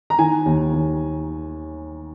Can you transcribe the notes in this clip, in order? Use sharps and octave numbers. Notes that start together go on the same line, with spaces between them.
A#5
D#3 G#5
D#2
D#2